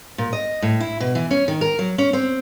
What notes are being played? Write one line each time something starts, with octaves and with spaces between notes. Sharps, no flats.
A#2
D#5
A2
E4
B2
E3
C#4
D#3
A#4
F#3
C#4
C4